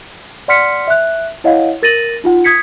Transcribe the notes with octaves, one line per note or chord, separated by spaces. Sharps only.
D5 F#5 C6 F6 B6 C#7
E5 F#6
E4 C#5 D#5 F5 F#5
A#4 A6 A#6 D#7 F#7
D#4 F4 F#5
D#6 G#6 B6 C#7